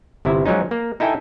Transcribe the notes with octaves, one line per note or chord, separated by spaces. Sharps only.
G1 C3 E4
F3 F#3 G#3 C#4 D#4
A#3
D#4 E4 A4 G5 G#5